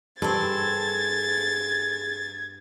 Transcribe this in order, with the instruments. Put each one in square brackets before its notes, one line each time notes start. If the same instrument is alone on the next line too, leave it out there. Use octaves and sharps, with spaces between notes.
[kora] G2 C4 [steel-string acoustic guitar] G#4 A4 [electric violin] G#6 [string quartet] A6